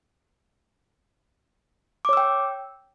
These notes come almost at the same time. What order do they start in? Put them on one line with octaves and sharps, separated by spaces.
D6 C#5 E6 G5